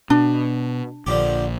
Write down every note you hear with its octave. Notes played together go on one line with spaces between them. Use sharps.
B2 D4
A#1 D3 F3 G4